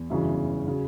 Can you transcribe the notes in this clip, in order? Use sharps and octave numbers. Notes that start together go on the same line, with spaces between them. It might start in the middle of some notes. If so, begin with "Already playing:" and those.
Already playing: E2
G1 F#2 C#3 E3
C#3 F#3